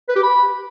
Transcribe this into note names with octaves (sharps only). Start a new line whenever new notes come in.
B4
G4
B5